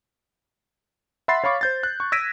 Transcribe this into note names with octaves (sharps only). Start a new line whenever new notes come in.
E5 F#5 B5 C6 A6 C7
C#5 F5 B5 C#6 D6
C5 G6 A6
F#6
C#6
E6 G#6 A#6 B6 D7 D#7